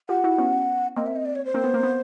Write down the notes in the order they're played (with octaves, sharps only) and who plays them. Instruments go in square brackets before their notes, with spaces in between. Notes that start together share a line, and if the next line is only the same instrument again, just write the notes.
[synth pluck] F4 G4 [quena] F#5
[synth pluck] E4 F#4
B3 C#4
[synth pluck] A#3 C4 [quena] D#5
[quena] E5
D#5
D5
C#5
C5
[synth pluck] A#3 C4
B3
A#3
B3